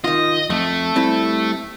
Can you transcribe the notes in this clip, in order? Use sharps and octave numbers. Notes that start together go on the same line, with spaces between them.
D#3 F4 D#5
F2 A3
G3 C4 E4